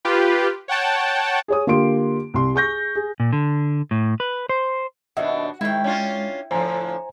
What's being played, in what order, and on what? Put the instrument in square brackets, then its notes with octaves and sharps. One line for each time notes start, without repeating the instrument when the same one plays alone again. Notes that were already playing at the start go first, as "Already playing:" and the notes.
[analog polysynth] F4 G4 B4
C#5 F#5 G5 A5
[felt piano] G#4 C#5 D#6
D3 A#3 F4 G4 C6 D7
C2 C6
G#4 C#6 G6 A#6
G#4
[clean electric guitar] A#2
D3
A2
B4
C5
[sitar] D#2 B2 D4 [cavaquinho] F#4 [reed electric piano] D#5 E5
[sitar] G#2 D#3 [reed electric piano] G#3 [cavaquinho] E4 G5
[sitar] C#4 D4 F4
[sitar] A2 D3 F3 [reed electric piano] C5 G#5 A#5